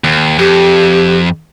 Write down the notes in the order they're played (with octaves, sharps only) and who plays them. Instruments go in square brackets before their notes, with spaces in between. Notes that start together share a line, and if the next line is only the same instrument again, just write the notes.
[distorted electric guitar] D#2
[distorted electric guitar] F2 [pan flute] G4